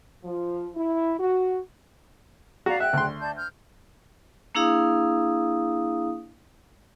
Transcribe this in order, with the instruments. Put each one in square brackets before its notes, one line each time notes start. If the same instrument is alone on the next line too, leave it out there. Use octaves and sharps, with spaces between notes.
[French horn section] F3
E4
F#4
[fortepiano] F#4 [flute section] D5 F5 A#5
[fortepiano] E5 [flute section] F#5 G5 F#6
[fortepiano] D2 C6
[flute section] D5 A5 G6
F6 G6
[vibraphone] A#3 D4 E4 G#4 F5 D#6